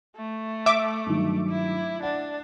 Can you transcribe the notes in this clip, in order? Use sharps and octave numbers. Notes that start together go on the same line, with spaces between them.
A3
E5 D6
G2 D#3 F#3
E4
D4 F#5